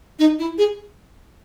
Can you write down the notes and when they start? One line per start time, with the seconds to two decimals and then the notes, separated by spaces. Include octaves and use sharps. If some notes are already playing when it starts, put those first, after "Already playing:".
0.19 D#4
0.39 E4
0.58 G#4